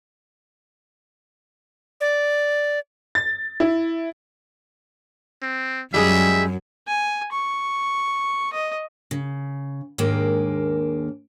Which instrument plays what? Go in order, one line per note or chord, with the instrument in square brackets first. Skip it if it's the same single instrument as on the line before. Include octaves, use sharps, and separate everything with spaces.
[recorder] D5
[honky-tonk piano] A6
E4
[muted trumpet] C4
[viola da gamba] F#2 [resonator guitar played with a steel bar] G3 G#3 G#4 [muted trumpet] E5
[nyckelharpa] G#5
C#6
D#5
[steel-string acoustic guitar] C#3
D#2 G#2 G#3 A#3 D4